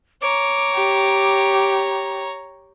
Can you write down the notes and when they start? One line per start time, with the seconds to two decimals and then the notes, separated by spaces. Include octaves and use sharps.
0.22 C#5 A#5 D6
0.74 G4